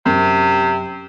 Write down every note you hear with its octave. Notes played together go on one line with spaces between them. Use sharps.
F#2 C3